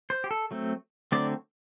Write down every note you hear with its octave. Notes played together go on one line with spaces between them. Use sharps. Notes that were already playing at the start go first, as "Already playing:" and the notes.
C5
G4
A4
F#3 A3 C4
D3 F#3 A3 C4 D5